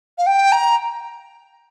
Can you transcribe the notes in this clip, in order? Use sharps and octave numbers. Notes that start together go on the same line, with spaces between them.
F5
G5
A#5